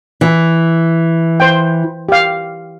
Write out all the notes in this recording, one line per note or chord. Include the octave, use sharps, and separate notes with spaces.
E3
C5 G5
G4 F5